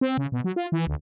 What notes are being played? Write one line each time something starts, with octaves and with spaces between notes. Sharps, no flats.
C4
C#3
B2
F#3
F4
E3
D2